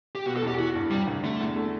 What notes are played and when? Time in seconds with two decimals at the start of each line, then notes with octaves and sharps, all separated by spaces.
0.15 G4
0.26 B2 F#4
0.37 A4
0.42 E2
0.48 G4
0.59 E3 F#4
0.75 G2
0.91 C3 G3
1.07 D2
1.23 D3 A3
1.40 E2
1.56 A3